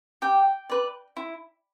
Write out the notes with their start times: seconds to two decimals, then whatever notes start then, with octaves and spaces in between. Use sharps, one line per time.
0.22 G4 G5
0.69 B4 D5
1.17 E4